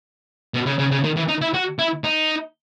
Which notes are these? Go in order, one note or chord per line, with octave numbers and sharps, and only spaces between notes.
B2
C#3
C#3
C#3
D#3
E3
D#4
E4
F#4
E4
D#4